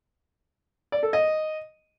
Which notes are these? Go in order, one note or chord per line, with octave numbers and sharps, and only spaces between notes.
D5
A4
D#5